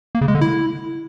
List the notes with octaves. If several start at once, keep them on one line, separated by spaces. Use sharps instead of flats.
A#3
C#3
G#3
D3
E4